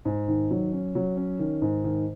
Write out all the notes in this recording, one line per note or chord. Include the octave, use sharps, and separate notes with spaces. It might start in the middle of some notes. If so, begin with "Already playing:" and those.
G#2
D#3
F#3
C#4
F#3
C#4
D#3
G#2
D#3